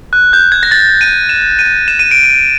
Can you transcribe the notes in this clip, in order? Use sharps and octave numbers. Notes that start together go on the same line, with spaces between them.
F#6
G6
G#6
A#6
A6
D#7
E7
D#7
E7
D#7
D7
D#7